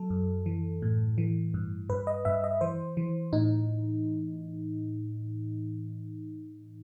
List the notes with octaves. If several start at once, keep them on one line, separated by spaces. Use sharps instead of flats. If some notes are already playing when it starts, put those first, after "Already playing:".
Already playing: F#3 A4
F#2
E3
A2
E3
G2
G2 B4
D#5
G2 E5
D#5
E3 C5
E3
A2 D#4